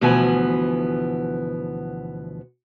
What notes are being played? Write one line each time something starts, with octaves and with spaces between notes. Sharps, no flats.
D2 B2 E3 F3 B3 G#5